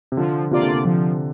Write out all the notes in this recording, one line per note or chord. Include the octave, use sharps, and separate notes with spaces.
C3
D3 F3
C3 A#3 F4 D5
D3
C3
D3 F3